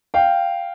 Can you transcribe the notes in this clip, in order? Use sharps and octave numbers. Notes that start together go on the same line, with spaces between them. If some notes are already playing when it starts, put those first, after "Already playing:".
F5 G5